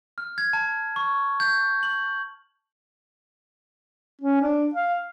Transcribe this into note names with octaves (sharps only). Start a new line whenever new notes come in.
F6
G#6
A5
C#6
G6
F#7
C#4
D4
F5